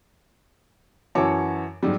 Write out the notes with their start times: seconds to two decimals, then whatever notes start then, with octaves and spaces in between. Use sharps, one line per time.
1.15 F#2 E3 F#4 C#5 A5 D6
1.83 G#2 F#3 G3